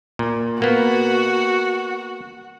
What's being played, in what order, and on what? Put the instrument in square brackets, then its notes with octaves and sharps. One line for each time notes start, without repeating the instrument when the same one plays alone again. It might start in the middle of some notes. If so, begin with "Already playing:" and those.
[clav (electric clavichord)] A#2
[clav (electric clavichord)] A#3 B3 [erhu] F#4